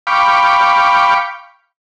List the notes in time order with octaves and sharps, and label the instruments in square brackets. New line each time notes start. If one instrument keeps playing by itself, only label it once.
[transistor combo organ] F5 G5 B5 C#6 D6